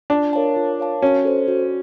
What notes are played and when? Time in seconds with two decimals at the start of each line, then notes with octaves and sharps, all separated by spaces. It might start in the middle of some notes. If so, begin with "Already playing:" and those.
0.10 D4 F4
0.33 A#4 C#5 F5 A5
0.56 F4
0.79 A#4 C#5 F5 A5
1.02 C#4 F#4
1.25 A4 C5
1.48 F#4